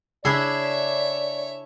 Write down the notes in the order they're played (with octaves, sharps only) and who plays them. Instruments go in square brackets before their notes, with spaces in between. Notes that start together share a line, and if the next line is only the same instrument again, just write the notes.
[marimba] C#3 [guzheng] D4 E4 G#4 [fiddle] C#5 E5 [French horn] D5